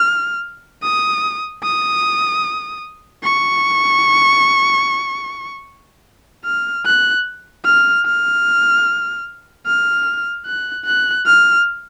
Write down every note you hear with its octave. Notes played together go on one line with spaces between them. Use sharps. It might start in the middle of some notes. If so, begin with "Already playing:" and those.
Already playing: F6
D#6
D#6
C#6
F6
F#6
F6
F6
F6
F#6
F#6
F6